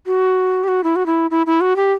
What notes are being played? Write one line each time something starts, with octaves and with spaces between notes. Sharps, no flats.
F#4
G4
F#4
E4
F#4
E4
E4
E4
F#4
G4